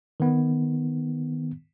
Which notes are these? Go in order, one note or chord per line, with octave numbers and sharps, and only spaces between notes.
D#3 B3